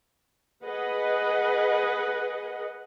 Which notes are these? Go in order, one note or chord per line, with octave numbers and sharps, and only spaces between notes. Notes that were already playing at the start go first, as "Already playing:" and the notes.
G#4 B4 D#5 F#5